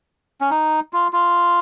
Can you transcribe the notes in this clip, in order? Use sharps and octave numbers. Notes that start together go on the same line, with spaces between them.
C#4
D#4
F4
F4